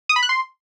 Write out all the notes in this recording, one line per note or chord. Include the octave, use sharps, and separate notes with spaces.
D#6
B5
F#6
C6